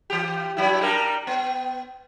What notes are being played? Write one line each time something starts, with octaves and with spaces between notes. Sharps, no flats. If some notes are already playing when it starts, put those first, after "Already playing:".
E3 G4
G2 F#3 E4
G3 D4 A#4
B3